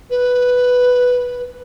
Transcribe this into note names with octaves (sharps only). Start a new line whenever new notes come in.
B4